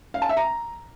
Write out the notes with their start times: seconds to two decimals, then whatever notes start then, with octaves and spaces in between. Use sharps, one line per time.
0.14 F5
0.22 A5
0.29 E5
0.37 A#5